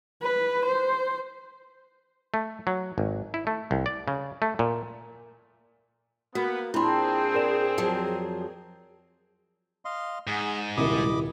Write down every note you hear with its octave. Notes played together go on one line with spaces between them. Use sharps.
B4
C5
A3
F#3
G#1
E4
A3
C2
D5
C#3
A3
A#2
A#3 B3 F#4
A#2 C4 D4 E4 G#4 B5 C6
A#4 D5 E7
F2 F3 F#3
D#5 F5 C6
G#2 G#4 F#5
D#1 C2 C3 A#4 D#5 B5 D6